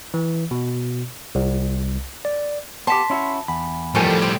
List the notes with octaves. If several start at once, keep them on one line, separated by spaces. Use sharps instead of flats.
E3
B2
C2
D5
B3 G4 A5 C6 B6
C#4 E4 F#4
E2 B5
A2 D#3 F3 G3 A4 G#5
C4